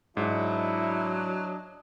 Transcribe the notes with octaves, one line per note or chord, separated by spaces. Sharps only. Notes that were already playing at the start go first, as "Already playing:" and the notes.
G#2 F#3 D4 E4 D#5